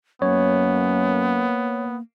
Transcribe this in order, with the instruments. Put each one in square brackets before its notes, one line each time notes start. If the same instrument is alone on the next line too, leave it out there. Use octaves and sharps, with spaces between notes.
[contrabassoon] F#2 [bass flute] A#3 [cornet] B3 [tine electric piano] C#5